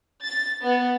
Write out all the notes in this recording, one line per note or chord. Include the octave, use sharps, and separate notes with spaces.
A6
B3